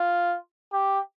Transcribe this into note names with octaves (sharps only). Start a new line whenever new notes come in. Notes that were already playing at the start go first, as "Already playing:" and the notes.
Already playing: F4
G4